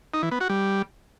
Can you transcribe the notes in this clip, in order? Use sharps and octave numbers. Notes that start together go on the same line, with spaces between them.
D#4
E3
B3
F#4
G3